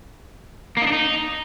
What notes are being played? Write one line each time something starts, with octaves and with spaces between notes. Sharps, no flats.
A#3
D#4
D4
D#4